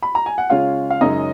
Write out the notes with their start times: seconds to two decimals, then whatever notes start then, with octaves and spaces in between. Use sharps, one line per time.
0.03 B5
0.15 A#5
0.26 G#5
0.38 F#5
0.50 C#3 G#3 C#4 F4 F5
0.90 F5
1.01 F#2 C#3 G#3 D#4 D#5